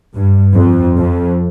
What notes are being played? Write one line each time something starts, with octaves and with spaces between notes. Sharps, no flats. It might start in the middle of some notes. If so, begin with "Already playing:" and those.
G2
F2
F2